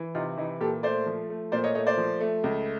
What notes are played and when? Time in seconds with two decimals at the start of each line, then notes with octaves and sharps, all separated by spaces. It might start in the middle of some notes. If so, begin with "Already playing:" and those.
Already playing: E3
0.15 C3 D#4 F4
0.38 E3 D#4
0.61 A#2 G4 A4
0.83 A3 C5 D5
1.06 F3
1.30 A3
1.52 A#2 C5 D5
1.64 C#5 D#5
1.75 A3 C#5 D#5
1.86 C5 D5
1.97 F3
2.20 A3
2.44 C#2